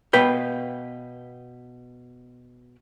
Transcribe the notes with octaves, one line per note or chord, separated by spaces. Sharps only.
B2 B4 F5 G5